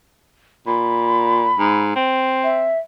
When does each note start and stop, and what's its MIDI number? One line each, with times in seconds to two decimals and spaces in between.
0.67 1.53 46
0.67 1.81 83
1.59 1.92 44
1.96 2.72 60
2.44 2.78 76